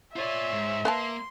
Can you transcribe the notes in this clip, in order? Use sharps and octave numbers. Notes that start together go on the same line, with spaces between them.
F4 C#5 D5 E5 C6
G#2
A#3 B4 F5 A5 C6